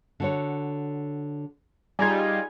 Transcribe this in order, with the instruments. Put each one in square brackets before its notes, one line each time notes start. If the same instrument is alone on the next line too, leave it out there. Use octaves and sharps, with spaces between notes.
[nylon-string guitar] D3 F#4 C#5
[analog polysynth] G3 D#4 F4 [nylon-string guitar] G#4 D#5 [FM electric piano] G#5 G#6